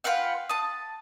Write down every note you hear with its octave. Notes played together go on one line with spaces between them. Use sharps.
F4 B4 F#5 G5
A5 D#6